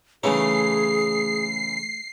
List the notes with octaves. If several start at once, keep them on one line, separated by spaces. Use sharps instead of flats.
C#3 E3 A3 D#4 G#4 C#5 C7